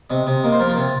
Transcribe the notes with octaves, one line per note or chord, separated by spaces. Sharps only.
C3 D#5
C3
A#3 D#5
C5
F3 A#4
F4
C3